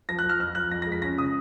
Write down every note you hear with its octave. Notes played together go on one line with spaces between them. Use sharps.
F3 A#6
F#6
F3
F6
F2 F6
F3 F#6
F2 A#6
A#6
G#3
B6
C#4 A#6
C#3 D#6